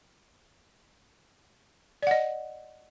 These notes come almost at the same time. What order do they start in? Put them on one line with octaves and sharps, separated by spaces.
D5 F#5 D#5